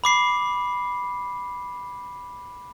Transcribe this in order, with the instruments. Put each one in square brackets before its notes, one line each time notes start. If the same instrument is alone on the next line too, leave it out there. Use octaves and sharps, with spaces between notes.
[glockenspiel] B5 D6 C7